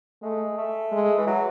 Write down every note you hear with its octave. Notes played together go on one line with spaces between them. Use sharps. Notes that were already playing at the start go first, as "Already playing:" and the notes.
G#3 A3
A3
G#3
E3
F#3